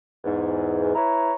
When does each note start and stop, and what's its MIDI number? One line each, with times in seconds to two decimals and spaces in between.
0.25 0.94 40
0.25 0.94 44
0.95 1.33 64
0.95 1.33 71
0.95 1.33 73
0.95 1.33 82